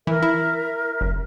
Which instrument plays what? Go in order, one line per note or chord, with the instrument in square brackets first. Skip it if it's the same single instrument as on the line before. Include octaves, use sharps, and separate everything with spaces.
[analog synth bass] E3 [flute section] A#4 E5
[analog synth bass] E4
F#1